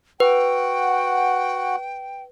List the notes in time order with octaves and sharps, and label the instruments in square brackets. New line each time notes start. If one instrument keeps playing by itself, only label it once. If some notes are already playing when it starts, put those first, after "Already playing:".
[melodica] F#4 F#5 [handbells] B4 [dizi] G5